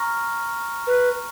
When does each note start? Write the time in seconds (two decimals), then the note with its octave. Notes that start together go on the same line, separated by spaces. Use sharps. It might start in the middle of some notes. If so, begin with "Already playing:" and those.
Already playing: A#5 C#6 F6 A#6
0.87 B4